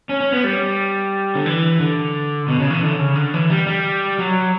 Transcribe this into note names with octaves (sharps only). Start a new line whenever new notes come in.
C#4
C#4
B3
G3
D3
E3
D3
B2
C#3
E3
D3
C#3
D3
E3
G3
G3
F#3